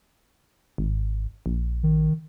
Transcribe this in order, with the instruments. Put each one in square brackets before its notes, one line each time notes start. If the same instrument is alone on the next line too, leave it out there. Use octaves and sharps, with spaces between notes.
[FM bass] G#1
A#1
[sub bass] D#3